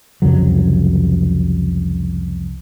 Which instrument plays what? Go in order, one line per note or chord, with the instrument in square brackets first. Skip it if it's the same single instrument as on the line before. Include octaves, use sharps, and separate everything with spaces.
[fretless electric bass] C2 F2 C#3 F#3